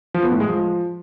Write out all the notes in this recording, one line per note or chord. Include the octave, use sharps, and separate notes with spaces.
F3
B3
A2
G#3
F3